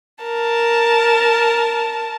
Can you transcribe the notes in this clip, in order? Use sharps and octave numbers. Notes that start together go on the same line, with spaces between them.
A#4 A5